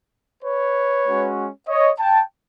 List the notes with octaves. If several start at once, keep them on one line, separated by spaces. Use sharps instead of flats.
B4 C#5
G#3 C#4 F#4
C#5 D#5
G5 A5